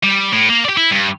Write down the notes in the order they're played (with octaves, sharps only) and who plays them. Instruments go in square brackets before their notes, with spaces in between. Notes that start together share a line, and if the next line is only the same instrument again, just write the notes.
[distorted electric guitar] G3
A2
A#3
G4 D5
E4
G2